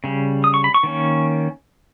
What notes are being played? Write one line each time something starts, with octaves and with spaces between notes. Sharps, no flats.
C#3 G3
D#6
C#6
B5
C#6
D#3 A#3 C#4